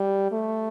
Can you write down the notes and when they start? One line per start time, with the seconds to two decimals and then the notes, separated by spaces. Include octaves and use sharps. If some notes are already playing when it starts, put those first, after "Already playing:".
Already playing: G3
0.32 A3